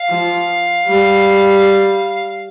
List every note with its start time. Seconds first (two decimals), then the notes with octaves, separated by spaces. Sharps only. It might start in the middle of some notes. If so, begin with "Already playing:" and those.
Already playing: F5
0.09 F3
0.86 G3